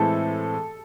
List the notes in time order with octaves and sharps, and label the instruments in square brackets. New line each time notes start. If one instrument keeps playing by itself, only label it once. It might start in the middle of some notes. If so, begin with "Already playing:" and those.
Already playing: [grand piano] A2 E3 G#3 C4 E4 [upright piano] A4